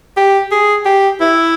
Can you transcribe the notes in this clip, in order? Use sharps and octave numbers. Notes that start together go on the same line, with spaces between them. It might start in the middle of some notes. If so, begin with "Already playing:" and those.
G4
G#4
G4
E4